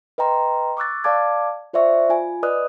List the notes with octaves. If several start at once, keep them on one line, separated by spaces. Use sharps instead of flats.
B4 D#5 G5 A#5 C6
C#6 D6 E6 F#6 A6
D5 F5 A5 D6 G#6
F4 C5 D5 E5 C#6
F4 G#5
B4 D5 D#5 D#6 F#6